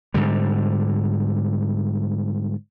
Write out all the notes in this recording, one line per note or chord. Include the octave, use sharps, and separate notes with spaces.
G#2 D3 G3